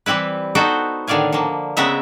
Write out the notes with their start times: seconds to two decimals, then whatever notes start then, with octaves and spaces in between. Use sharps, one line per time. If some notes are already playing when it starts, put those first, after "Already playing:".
0.06 E3 G3 C4 E4 B4
0.55 B3 D#4 F#4 A4 C5 G5
1.07 A2 D3 D#3 D5 F5 G#5
1.32 D3 F3 A#3
1.77 C#3 G#3 B3 C4 E5 A#5